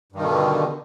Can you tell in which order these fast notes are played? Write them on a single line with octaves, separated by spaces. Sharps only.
G2 D#3 B2 D3